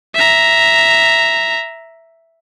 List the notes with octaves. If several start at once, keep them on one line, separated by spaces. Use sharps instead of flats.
E5 A#5